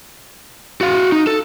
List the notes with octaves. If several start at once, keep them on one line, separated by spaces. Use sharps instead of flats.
F#4 F5
D#4
A4